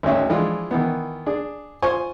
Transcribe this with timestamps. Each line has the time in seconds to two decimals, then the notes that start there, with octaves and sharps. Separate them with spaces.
0.03 G#1 D2 C#4 E5
0.30 E3 F3 G#3 D4 F4
0.71 D#3 E3 B3
1.26 D4 G#4
1.82 F4 C5 G#5 C#6